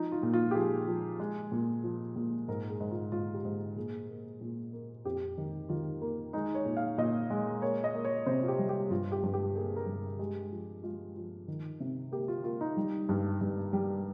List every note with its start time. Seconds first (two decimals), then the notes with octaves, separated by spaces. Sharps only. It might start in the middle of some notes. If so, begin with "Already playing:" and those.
Already playing: F3 D#4
0.12 F4
0.23 A#2
0.33 F4
0.51 G4
0.55 F3 G#4
0.88 F3
1.20 G#3
1.52 A#2
1.83 F3
2.16 A#2
2.48 G#2 A#4
2.69 G#4
2.80 G#2
2.91 F4
3.12 G#2 F4
3.34 G4
3.45 G#2
3.76 A#2 G#4
4.09 A#3
4.41 A#2
4.73 A#3
5.05 F2 G4
5.38 D#3
5.69 D#3 F4
6.01 A#3
6.33 G#3 D#4
6.55 C#5
6.66 A#2
6.77 F5
6.98 A#2 D#5
7.30 G#3
7.62 A#3 C#5
7.84 D#5
7.95 A#3
8.05 C#5
8.26 C3 C5
8.43 F4
8.48 G4
8.59 G3
8.69 G4
8.90 G2 F4
9.12 G4
9.23 G2
9.34 G4
9.55 A#3 G#4
9.76 A#4
9.87 G2
10.19 G#3 G4
10.51 F3
10.83 G#3 F4
11.16 F3
11.48 D#3
11.80 C3
12.12 A#3 G4
12.28 F4
12.44 A#3 F4
12.61 D#4
12.77 G3
13.09 G2
13.41 G2
13.73 G3